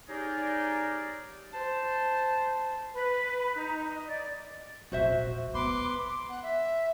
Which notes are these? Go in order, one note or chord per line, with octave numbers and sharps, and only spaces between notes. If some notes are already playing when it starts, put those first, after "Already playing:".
C#4 D#4 G4 G#4 A#4 D5
C5 A5
B4
D#4
D#5
D5
E1 A#1 F#4 C5 E5
B3 B4 C6 D6
F#5
E5